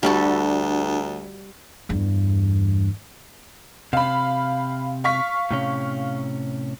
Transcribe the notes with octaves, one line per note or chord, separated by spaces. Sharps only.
D2 G3 D4 F#4 A4
E2 G2
C3 F5 B5
F5 C#6 B6
A2 C3 C#4